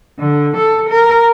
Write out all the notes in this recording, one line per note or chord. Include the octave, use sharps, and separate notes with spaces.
D3
A4
A#4